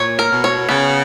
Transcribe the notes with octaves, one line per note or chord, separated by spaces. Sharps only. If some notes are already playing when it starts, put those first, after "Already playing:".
Already playing: A#2 C#5
A#4
B2
C#5
C#3 B3